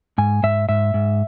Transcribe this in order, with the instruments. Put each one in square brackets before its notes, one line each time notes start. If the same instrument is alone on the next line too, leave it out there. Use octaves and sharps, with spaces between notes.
[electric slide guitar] G#2 G#5
G#2 E5
G#2 E5
G#2